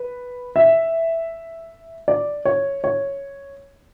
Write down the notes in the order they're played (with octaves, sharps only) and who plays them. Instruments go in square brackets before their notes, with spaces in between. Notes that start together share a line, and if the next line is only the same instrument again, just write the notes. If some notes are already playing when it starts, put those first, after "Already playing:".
Already playing: [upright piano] B4
E5
D5
C#5
C#5